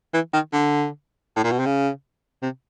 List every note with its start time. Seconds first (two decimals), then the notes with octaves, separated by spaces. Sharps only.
0.14 E3
0.33 D#3
0.53 D3
1.36 A2
1.44 A#2
1.51 B2
1.59 C3
1.66 C#3
2.43 C3